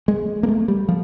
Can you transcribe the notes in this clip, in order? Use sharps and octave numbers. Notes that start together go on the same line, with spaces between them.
G#3
A#3
A3
G3
F3